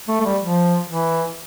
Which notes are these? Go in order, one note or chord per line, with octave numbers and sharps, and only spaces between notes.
A3
A3
G3
F3
E3